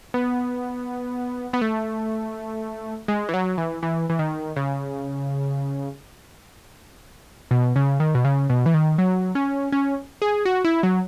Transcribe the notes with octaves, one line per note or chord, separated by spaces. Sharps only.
B3
B3
A3
G#3
E3
F#3
E3
E3
E3
D#3
C#3
B2
C#3
D#3
B2
C#3
B2
E3
D#3
F#3
C#4
C#4
G#4
F#4
E4
F#3